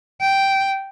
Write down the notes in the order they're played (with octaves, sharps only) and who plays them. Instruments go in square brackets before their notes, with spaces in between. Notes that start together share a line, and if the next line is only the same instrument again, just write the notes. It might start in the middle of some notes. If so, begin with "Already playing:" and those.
[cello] G5